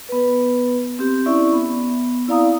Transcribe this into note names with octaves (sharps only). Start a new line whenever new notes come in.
B3 B4
C4 G4
C#4 E4 D5 E5 C#6
B3
C4 E4 D5 F5 A#5 D#6